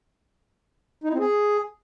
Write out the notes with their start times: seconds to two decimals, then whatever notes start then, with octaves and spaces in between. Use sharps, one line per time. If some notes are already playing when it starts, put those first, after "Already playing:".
1.04 D#4
1.09 E4
1.14 C4
1.19 G#4